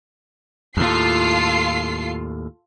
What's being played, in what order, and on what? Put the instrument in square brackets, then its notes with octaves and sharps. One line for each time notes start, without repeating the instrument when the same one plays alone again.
[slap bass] D#2 A2 [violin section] F4 A4 C7